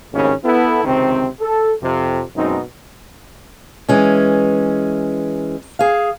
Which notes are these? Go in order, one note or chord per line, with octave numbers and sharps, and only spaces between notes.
G#1 D#2 A2 C#3 A#3 C#4
B3 E4 A4
C#2 C3 D#3 C4
A4
F2 C3
F#2 B2 G#3 C4 D#4
E3 G#3 C#4
G#4 F5